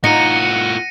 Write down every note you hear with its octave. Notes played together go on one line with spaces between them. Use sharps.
A2 D#4 F4 F#5 A#6 C#7 D#7